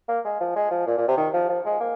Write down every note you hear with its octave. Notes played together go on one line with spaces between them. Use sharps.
A#3
G#3
F3
G#3
F3
A#2
A#2
C3
D#3
F3
F3
G#3
A#3